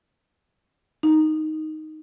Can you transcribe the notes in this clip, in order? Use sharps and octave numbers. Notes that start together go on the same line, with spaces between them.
D#4